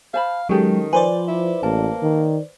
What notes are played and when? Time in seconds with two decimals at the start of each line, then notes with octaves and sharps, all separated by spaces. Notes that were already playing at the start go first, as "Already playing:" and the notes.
0.14 C5 F5 A5 B5
0.49 D#3 F#3 G#3 C#4 G4 A4
0.93 F3 B4 C5 D5 G#5
1.28 E4
1.63 A1 A#3 A5
2.02 D#3